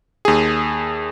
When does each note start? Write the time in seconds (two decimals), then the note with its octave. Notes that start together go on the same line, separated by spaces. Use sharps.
0.25 D#2 G#4